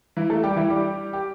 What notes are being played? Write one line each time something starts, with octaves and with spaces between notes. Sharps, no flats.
E3 E4
A3 A4
G3 G4
E3 E4
G3 G4
G4